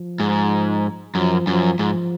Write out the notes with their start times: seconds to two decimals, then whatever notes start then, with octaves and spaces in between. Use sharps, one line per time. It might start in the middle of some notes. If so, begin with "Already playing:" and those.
Already playing: F3
0.20 G#2
1.15 F#2 F3
1.47 F#2 F3
1.79 G#2 F3